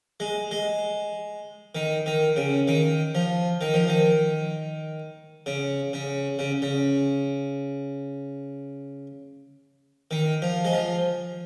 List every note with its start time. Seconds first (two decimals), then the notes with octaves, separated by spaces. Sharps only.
0.20 G#3
0.51 G#3
1.75 D#3
2.06 D#3
2.36 C#3
2.68 D#3
3.15 F3
3.61 D#3
3.74 F3
3.88 D#3
5.46 C#3
5.93 C#3
6.39 C#3
6.62 C#3
10.11 D#3
10.42 F3
10.65 G#3
10.73 F3